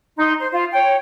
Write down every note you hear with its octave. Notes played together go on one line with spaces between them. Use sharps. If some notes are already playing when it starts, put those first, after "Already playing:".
D#4 C6
C5
F4 C5
C#5 G5